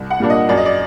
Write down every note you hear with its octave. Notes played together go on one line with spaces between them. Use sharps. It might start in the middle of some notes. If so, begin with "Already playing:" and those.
Already playing: C2
F#5
A#2 G3 A#3 D4
D#5
F#2 D5
D#5
D5